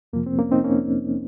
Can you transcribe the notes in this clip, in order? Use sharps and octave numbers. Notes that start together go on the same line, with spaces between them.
F2 C3 F3 A#3
C4
A#3 C#4
C4 D#4
A#3 C#4